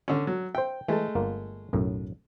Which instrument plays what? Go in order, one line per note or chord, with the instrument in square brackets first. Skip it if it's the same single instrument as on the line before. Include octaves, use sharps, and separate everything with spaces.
[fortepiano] D3 C#4
F#3
[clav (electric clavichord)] C5 E5 [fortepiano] G5
[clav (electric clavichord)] E3 A5 [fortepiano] G#3 A3
[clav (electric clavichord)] G1 A#3 F4
B1 F#2 A2